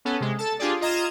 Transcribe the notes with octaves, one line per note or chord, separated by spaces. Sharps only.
B3 C#4 A4
C3 G#3
A4 A5
D4 F4 G4 G#4 D5
F4 D#5 A#5 G#6 E7